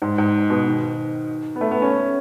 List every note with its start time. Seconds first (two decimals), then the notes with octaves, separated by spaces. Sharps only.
0.02 G#2
0.18 G#2
0.50 B2
0.66 D#3
1.56 B3
1.61 A3
1.71 B3
1.82 C#4